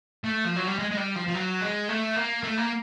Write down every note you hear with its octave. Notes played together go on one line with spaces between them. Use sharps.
A3
F3
F#3
G3
G#3
G#3
G3
F3
F3
F#3
G#3
A3
A#3
A3
A#3